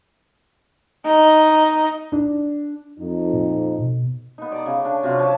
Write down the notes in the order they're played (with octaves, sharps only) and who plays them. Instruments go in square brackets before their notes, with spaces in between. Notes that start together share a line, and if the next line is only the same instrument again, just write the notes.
[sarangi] D#4
[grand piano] D4
[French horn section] F2 D#4
[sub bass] A#2
B2
[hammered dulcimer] B3 D#4
D5 A#5
C#3
D4
C3 F#3 F4 F5
F3 C#5 F#5 A5